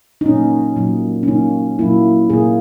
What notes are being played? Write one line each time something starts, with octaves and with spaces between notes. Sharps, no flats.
D#4
A#2 F#3 A#3 C#4
A#2 F#3 A#3
C#4
A#2 F#3 A#3 D#4
A#2 F#3 A#3 E4
A#2 A#3 G#4